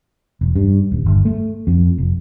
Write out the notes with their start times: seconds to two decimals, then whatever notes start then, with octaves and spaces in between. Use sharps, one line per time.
0.41 E1
0.56 G2
0.92 D#1
1.06 G1
1.25 A3
1.67 F2
1.98 F1